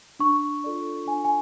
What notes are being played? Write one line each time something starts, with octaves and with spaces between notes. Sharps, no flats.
D4 C#6
F4 A4 D5
D4 G#5
G#5